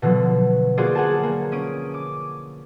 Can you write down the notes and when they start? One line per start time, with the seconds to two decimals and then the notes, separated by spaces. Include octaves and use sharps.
0.02 B2 D3 F3 F#3
0.77 A#3 F4 F#4 G#4 C5 D5
0.95 G#4 F#5 G#5 A5
1.23 A#3
1.52 C#4 D#6 D7
1.94 D6